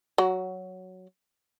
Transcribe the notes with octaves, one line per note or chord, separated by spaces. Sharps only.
F#3 F#4